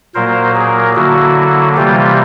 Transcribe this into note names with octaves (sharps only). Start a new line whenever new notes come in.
A#2 F#3 A#3 A#4 C5
G#4 A#4
D3 F#3 A#3 E4 F#4
C3 E3 G3 A#3 F4 G4